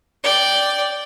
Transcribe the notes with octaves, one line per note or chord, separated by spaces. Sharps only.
D5 G5